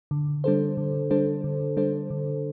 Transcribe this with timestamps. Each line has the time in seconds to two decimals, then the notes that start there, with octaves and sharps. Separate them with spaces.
0.11 D3
0.44 G3 D4 A4 C5
0.77 D3
1.11 G3 D4 A4 C5
1.44 D3
1.77 G3 D4 A4 C5
2.10 D3